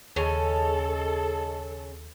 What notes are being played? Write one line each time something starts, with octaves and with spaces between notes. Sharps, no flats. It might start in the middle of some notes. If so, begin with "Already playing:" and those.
D#2 C#3 C#4 G#4 A4 D#5 A5